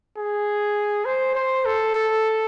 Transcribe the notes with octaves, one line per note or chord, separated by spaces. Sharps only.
G#4
C5
C5
A4
A4